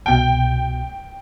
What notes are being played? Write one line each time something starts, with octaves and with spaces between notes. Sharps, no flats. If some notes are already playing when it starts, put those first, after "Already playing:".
C2 B2 G5 G6